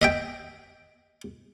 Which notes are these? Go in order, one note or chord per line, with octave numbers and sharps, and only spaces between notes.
D#5 E5 G5